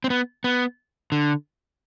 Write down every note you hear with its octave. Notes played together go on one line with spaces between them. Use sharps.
C4
B3
B3
D3